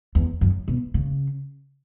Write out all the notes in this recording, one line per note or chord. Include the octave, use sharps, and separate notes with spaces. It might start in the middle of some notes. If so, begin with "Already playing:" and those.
E2
F#2
B2
C#3